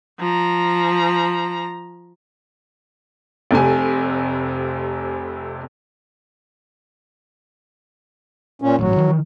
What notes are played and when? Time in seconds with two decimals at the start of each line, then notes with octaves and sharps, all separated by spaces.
0.20 F3 A#5
3.51 F1 F2 C3 G#5
8.62 A#2 C#4
8.78 G#1 A2 F#3
8.96 D#3 E3